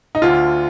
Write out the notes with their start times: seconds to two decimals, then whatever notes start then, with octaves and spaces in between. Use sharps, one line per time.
0.15 D#4
0.22 D2 D3 F4